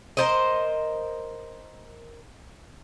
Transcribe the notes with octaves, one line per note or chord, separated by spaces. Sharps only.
A#4 C5 D#5